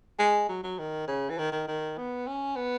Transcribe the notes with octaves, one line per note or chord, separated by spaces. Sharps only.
G#3
F#3
F#3
D#3
C#3
E3
D#3
D#3
D#3
B3
C#4
B3